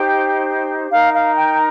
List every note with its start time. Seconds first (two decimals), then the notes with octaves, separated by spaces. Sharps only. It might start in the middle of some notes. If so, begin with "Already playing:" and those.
Already playing: D#4 G4 C5 G5
0.89 D#4 A#4 F5
1.12 F5
1.35 G5